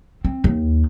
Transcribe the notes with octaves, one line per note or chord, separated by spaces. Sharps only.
C4
D#2